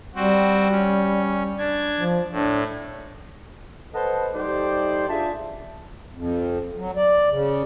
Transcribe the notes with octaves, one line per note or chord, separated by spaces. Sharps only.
G3 C4 F#4
C#4
D4 G#6
F3
A2 D4
A4 B4 C5 D#5 F#5 A5
G3 D#4 G4 A4 C5 D5
D4 F4 G#4 E5 A5
F2
F#3
D5
C#3